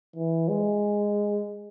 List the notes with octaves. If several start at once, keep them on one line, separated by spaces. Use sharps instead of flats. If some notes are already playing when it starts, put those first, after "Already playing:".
E3
G#3